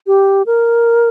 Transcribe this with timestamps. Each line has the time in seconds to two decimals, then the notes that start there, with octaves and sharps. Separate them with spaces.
0.07 G4
0.46 A#4